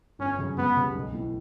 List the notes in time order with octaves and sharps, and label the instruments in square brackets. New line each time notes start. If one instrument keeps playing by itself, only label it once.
[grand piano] G1 [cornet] C#4
[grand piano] F#2 C#3
[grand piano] C#2 [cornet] B3
[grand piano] C#3 G3
B1
A2 E3